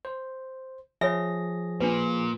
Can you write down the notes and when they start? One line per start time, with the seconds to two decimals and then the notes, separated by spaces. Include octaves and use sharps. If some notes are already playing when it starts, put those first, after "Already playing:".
0.05 C5
1.01 F3 G#4 C#5 E5 A#6
1.80 A#2 D4 F4 B4